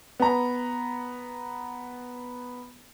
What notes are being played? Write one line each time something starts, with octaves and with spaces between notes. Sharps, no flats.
B3 A#5